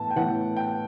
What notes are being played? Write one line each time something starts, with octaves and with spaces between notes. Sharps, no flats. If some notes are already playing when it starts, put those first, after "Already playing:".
Already playing: A2 E3 B3 A5
G5
A2 E3 B3 F#5
G5